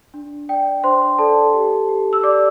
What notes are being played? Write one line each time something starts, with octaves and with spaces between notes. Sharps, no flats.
D4
D5 G5
D4 C5 C6
A4 D5 A5
G4
G4
E6
G4 D5 D6